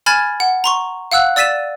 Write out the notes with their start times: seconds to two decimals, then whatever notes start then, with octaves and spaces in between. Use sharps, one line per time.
0.06 G#5 B5 F6 G#6 A6 E7
0.40 F#5
0.64 A#5 C6 C#6
1.12 F5 F#5 E6 F#6
1.36 D5 E6 A6 B6 D#7 E7